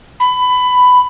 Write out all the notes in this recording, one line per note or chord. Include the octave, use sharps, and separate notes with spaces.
B5